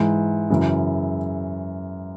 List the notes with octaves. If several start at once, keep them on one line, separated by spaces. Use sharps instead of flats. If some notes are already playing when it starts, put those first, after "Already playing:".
Already playing: G#2 E3
F#2 C#3 E3